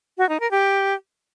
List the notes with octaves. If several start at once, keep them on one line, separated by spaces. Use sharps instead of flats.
F#4
D#4
A#4
G4